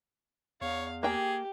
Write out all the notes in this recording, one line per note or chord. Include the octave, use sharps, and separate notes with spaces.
E2 C#5 F5
A#3 G4 G#4 G5 G#5